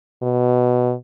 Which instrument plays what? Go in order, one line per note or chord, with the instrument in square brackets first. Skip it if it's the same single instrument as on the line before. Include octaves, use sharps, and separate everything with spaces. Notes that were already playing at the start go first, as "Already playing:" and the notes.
[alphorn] B2